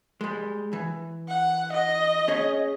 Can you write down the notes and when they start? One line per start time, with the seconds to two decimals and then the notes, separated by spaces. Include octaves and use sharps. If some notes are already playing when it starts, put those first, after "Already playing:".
0.21 G3 G#3
0.73 E3
1.28 F#5
1.73 D#5
2.28 C#4 G#4 C#5